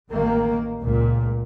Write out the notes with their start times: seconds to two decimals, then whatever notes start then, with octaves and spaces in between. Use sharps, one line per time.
0.12 A1 D#3 A#3
0.81 C#2 A#2